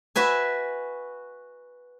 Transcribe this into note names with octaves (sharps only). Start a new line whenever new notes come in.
F#4 B4 E5 G#5